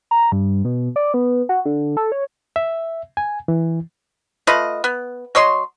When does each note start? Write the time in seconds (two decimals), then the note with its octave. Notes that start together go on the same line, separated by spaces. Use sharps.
0.11 A#5
0.32 G2
0.65 B2
0.96 D5
1.14 B3
1.49 F#4
1.66 D3
1.97 A4
2.12 C#5
2.56 E5
3.17 G#5
3.48 E3
4.47 A3 F4 B4 D#5
4.84 B3
5.35 F#3 C#5 D#5 C6